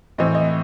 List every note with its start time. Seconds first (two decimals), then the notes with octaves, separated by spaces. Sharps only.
0.18 A2 E3 C4 D#5
0.35 D#5